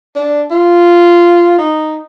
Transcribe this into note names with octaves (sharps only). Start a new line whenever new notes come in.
D4
F4
D#4